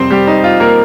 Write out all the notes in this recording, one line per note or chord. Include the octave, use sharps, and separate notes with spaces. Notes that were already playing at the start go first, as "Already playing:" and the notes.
Already playing: F2 C3 G3 C4 C5
G3 G4
D#4
F4
A#3 A#4